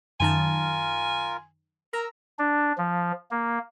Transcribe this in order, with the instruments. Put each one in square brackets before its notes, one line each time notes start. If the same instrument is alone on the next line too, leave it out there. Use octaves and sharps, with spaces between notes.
[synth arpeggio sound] F#2 D#3 A5 [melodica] F4 A#4 [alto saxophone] G#5
[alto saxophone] A#4 [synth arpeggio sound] A#5 [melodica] E6
[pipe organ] D4
F3
A#3